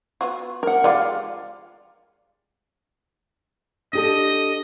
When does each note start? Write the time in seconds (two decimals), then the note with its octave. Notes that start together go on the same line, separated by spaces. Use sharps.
0.21 B3 F4 F#4
0.63 A#4 F#5
0.84 G#3 F4 G4 D5 F5
3.93 D4 G4 A4 D#5